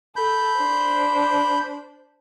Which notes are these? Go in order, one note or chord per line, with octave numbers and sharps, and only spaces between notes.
A4 B5 G6
D4 C5